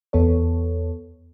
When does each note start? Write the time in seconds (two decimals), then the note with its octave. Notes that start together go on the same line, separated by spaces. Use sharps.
0.13 E2 B3 A4 C#5